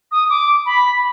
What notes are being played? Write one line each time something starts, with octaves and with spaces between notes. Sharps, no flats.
D#6
D6
B5